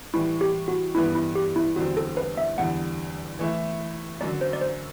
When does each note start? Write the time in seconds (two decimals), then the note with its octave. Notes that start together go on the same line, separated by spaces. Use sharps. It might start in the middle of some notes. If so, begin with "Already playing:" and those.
0.13 A2 E3 G3 E4
0.41 G4
0.68 F#4
0.95 G2 E3 G3 B3 E4
1.15 E4
1.35 G4
1.56 E4
1.76 E2 D3 G3 C4 F#4
1.97 A4
2.17 B4
2.37 E5
2.58 E2 D3 G3 F#5
3.39 E3 A3 E4
4.21 F#2 D3 F#3 D5
4.41 C5
4.53 D5
4.61 C5